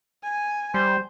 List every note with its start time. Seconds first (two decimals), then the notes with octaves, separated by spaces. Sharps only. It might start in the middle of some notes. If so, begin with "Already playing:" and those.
0.23 G#5
0.74 G3 C5